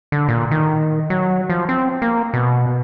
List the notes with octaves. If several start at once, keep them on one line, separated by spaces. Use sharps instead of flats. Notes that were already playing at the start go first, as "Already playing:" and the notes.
D3
A#2
D#3
F#3
F3
C4
A#3
B2